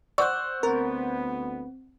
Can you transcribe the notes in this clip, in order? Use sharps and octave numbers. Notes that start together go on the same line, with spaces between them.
C5 D5 F#5 C#6 E6 F#6
D2 B3 C4 A#4